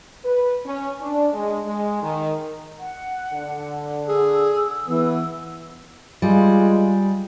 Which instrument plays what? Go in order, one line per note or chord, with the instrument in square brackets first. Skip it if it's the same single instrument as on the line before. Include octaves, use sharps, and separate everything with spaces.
[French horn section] B4
C#4
D4
G#3
G#3
D#3
[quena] F#5
[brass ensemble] D3
[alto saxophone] G#4 [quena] E6
[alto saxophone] E3 [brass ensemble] B3
[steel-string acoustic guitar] G3 [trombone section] G#3 F4